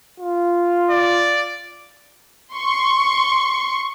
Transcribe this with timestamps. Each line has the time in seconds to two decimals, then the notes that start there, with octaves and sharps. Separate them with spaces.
0.20 F4
0.91 D5
2.56 C6 C#6